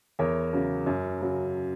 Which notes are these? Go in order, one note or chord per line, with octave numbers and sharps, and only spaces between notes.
E2 A#4 C#5
C#3 F#3
F#2
C#3 F#3